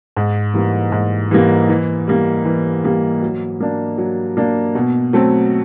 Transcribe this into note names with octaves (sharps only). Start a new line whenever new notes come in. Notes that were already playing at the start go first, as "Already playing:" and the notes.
G#2
E3 G3 A#3
G#2
E3 G3 A#3
E3
G3 A#3
E3
G3 A#3
F#3
A#3 D4
F#3
A#3 D4
B2
F#3 A3 C4